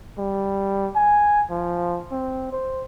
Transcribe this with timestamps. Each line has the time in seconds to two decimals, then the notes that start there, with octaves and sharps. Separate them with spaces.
0.18 G3
0.96 G#5
1.51 F3
2.12 C4
2.52 C5